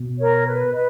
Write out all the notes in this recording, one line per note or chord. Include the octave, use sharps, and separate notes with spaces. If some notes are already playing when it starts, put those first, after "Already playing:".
Already playing: B2
A#4 C#5
B4
B4 D#5